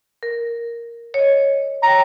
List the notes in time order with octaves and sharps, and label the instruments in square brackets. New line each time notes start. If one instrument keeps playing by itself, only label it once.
[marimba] A#4
C#5 D#5
[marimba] C#5 G5 [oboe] A#5